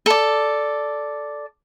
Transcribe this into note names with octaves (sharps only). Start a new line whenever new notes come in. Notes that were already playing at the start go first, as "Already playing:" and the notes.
A4 D5